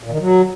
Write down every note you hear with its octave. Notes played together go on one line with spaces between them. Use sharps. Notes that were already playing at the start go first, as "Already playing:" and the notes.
A#2
D#3
F#3